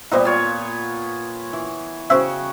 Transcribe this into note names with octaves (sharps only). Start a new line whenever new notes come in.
A#2 G3 B3 D#4 C5 D#5
F4 C#5
E3
C#3 F#4 C5 E5 G5